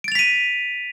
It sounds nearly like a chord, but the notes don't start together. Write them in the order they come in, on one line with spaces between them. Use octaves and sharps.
D7 A6 F7 B6 D#7